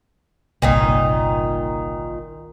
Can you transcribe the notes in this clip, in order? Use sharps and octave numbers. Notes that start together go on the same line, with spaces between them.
G1 C2 A#2 D#3 D#4